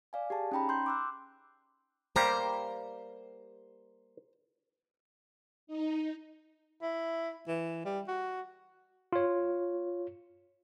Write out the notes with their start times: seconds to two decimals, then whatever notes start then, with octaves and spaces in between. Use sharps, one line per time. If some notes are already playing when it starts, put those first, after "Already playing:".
0.13 D5 F5 G#5
0.30 G4 G#4 A5
0.51 C#4 D#4 G5 A#5 B5
0.69 C6 G6
0.86 D6 E6 F#6
2.16 G3 A#3 G4 C5 A#5
5.67 D#4
6.82 E4
7.48 E3
7.85 G3
8.08 F#4
9.13 F4 C#5